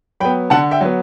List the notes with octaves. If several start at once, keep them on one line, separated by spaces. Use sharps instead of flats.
F#3 B3 G5 B5
D3 F#5 A5
E5 G5
F#3 B3